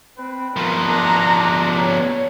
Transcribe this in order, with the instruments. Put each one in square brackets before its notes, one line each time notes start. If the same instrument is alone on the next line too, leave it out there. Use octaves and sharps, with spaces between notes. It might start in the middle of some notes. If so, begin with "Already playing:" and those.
[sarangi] C4 [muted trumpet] B4
[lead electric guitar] F3 B3 [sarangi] A#4
[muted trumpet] D4 [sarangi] A#5
[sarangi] C#5